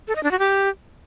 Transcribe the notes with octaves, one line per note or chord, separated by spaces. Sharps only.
A4
D#5
D4
F#4
G4